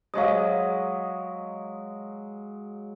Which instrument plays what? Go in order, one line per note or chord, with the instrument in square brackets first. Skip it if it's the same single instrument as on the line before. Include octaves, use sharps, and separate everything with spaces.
[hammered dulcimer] F#3 G#3 D#5 [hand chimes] F5 D#6